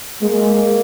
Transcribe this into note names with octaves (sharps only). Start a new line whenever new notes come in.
G#3 A#3